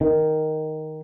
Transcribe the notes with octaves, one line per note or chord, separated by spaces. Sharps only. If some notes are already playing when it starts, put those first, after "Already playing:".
D#3